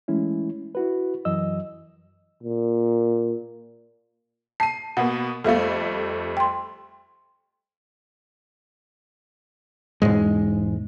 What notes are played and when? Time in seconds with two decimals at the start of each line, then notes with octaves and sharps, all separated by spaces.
0.08 E3 G#3 A3 C#4 E4
0.75 E4 F#4 B4
1.25 F#2 E3 F#3 D#5 E6
2.43 A#2
4.60 A5 C7 D#7
4.97 B2 A#3 B3 F#5
5.44 F2 G3 A3 A4 E5 F5
6.37 G5 C6
10.02 E1 F2 G#2 G#3